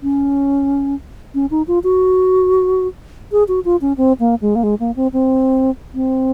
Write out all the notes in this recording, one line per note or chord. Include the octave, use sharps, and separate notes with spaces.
C#4
C#4
D#4
F4
F#4
G#4
F#4
F4
C#4
C4
A#3
G#3
A#3
G#3
A#3
C4
C4
C4